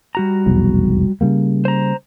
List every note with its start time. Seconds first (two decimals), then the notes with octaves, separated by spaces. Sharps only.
0.15 G3 F#4 A#5
0.46 F1 B1 E2
1.21 C#3 G3 A#3
1.65 C5 A#5